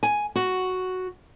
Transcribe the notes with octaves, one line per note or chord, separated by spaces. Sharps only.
G#5
F#4